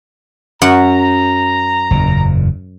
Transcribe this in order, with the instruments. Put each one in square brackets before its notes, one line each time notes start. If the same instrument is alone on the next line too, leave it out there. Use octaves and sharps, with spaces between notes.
[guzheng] F#2 F#5 [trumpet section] A#5
[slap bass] F#1 E2 A#2